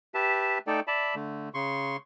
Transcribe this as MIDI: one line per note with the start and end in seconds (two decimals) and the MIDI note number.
0.14 0.58 67
0.14 0.58 71
0.14 0.58 76
0.14 0.58 81
0.67 0.80 57
0.67 0.80 63
0.67 0.80 69
0.67 0.80 74
0.67 0.80 79
0.87 1.15 74
0.87 1.15 76
0.87 1.15 81
0.87 1.15 83
1.15 1.49 50
1.15 1.49 57
1.54 1.97 49
1.54 1.97 84
1.54 1.97 85